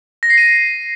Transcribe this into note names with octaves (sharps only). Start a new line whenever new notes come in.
A#6
C7
D#7